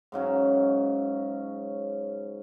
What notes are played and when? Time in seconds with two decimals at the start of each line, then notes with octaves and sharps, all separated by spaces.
0.12 G#2 C#3 F#3 C#4